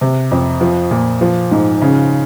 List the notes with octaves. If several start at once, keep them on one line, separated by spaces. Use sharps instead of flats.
C3
F2
F3
A#2
F3
G#2
C#3